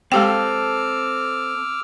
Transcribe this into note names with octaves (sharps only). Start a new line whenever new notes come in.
G#3 C4 G4 A4 G5 D6 E6 F6